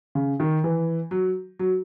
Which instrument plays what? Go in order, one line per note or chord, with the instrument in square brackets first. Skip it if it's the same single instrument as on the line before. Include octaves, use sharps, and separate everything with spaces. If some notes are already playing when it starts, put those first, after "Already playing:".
[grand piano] C#3
D#3
E3
F#3
F#3